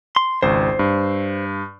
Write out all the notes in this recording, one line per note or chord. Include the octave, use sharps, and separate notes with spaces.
C6
G#1 C#2 C5
G2